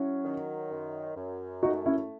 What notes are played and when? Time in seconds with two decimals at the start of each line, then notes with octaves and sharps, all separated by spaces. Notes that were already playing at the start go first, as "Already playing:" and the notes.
Already playing: F#3 C#4 E4
0.25 D#3
0.71 F#2
1.16 F#2
1.63 A3 D#4 F#4
1.86 C#4 E4